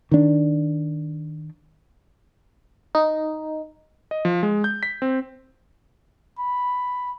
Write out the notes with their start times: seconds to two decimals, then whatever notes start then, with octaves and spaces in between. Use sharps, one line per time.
0.12 D#3 D4
2.95 D#4
4.11 D#5
4.25 F3
4.43 G#3
4.64 G6
4.83 B6
5.02 C4
6.39 B5